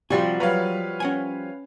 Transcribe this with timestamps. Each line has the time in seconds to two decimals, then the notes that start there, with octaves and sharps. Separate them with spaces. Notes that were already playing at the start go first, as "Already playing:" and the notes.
0.10 C3 F3 G3 F#4 G#5
0.40 F#3 B4 C#5 F5 A#5 B5
1.00 C#4 F#5 G#5